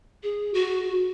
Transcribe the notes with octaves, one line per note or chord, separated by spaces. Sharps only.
G#4
F#4